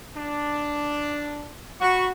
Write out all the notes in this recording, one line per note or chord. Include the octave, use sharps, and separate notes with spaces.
D4
F#4 B5 C#6